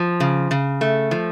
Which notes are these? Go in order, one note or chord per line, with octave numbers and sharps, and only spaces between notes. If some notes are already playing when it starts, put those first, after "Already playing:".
Already playing: F3
C#3
C#3
A3
F3